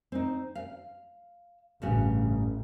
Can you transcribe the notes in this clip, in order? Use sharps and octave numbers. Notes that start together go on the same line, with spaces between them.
C4 D#4
F5
A1 G2 C#3 F#4